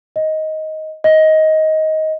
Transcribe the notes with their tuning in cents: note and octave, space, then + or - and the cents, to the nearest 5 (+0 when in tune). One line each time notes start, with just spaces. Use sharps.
D#5 +10
D#5 +15